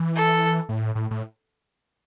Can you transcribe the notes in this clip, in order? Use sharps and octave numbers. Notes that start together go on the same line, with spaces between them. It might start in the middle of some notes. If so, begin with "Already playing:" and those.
Already playing: E3
A4
A2
A2
A2